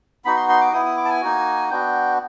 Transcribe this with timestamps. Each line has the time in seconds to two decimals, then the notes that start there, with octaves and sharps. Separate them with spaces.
0.25 B3 D#4 F#4 B5
0.37 C6
0.49 C6
0.61 D6
0.73 B3 E4 D#6
0.85 D#6
0.97 D6
1.05 A5
1.10 G#5
1.21 A#3 D#4 F#4
1.70 B3 D4 F#4 G5